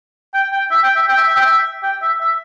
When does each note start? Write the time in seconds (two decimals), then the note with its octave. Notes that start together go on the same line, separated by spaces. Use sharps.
0.34 G5
0.52 G5
0.71 E5
0.84 G5
0.96 E5
1.08 G5
1.17 E5
1.28 E5
1.37 G5
1.46 E5
1.83 G5
2.02 E5
2.21 E5